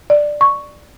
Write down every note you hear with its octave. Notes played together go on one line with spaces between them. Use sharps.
D5
C#6